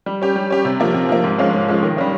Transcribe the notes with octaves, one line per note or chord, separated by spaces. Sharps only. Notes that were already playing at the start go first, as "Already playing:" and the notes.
G3
C#4 G4
G3
C#4 G4
C3
F3 A#3
C3
F3 A#3
G#2
F3 G#3 C#4 F4
G#2
F3 G#3 C#4 F4
D#3
G3 C#4 F4